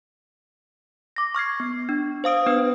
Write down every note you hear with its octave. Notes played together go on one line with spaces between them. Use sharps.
D6 A#6
C#6 F6 G#6 C7
B3
D4
C5 F5 D#6 D7
B3 D4 B4